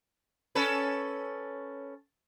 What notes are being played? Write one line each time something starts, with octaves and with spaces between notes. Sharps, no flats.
C#4 A4 B4